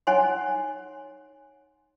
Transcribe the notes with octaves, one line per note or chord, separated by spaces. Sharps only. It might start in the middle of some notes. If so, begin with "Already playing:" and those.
D#4 C#5 F#5 G#5 C6